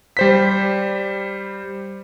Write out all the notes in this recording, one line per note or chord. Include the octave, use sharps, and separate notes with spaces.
G3 C5 B6